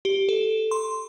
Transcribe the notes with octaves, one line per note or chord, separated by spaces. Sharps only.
G4
A4
C6